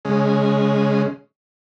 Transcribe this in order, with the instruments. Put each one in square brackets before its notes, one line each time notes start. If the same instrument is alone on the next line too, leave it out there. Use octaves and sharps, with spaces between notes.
[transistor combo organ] C#3 G#3